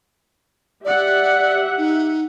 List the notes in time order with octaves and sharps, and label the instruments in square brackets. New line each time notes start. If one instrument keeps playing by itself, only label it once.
[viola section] G4 E5 F#5 [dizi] D5
[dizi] D#4